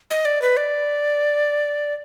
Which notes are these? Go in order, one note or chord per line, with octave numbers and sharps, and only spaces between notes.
D#5
D5
B4
D5